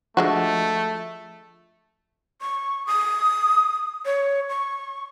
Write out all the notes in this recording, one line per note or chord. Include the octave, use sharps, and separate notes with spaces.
D3 F3 G#3 A3 F#4
C#6
D#6
C#5
C#6